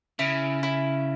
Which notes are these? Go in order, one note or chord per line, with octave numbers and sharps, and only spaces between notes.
C#3 E4
E4